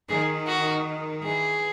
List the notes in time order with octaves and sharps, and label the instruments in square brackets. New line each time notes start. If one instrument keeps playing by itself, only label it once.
[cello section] D#3 [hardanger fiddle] G#4
[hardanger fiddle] F#4
[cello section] E3 [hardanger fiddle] G#4